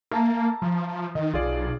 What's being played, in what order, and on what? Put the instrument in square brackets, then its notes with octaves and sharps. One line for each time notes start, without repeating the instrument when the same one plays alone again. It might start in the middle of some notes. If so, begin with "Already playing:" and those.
[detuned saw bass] A#3 [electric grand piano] E5 A5 A#5
[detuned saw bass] F3
[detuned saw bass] D#3 [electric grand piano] D#5
[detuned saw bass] B1 [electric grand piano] F4 G#4 D5